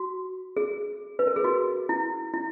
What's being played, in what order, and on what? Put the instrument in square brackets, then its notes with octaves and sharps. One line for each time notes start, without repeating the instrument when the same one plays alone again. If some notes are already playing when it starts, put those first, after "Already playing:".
Already playing: [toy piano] F#4
G#4
B4
A#4
G#4
F#4
E4
E4